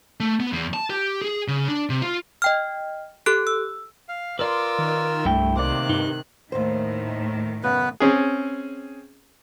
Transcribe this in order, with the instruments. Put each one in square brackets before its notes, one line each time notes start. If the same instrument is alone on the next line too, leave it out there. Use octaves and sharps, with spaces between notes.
[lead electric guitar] A3
B3
E2
A5
G4
G#4
C#3
D4
C3
F4
[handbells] D#5 G5 F6
G4 A4 F#6 D7
E6
[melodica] F5
[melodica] F4 A#4 E6 [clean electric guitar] B4 D5 C6 [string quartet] D6
[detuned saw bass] D#3
[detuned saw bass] C2 [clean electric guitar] G2 E4 G5 [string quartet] A3
[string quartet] C3 D#3 F#6 [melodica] A#3 D6 [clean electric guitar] C5 D5
[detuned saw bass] G2 [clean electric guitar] D#4
[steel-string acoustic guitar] D#2 C5 [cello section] A2 D#3
[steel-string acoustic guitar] F#2 C#3 [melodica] B3 B4
[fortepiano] C4 C#4 G#4